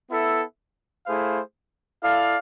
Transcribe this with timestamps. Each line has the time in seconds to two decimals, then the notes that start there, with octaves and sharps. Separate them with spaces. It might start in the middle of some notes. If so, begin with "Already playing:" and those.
0.10 B3 E4 A4 E5
1.07 A3 E4 G#4 C5 F5
2.03 E4 A4 D5 F5